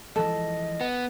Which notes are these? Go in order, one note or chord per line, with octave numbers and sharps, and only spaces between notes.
E3 F3 G#3 A4 D#5
B3